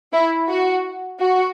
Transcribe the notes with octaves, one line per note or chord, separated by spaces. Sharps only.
E4
F#4
F#4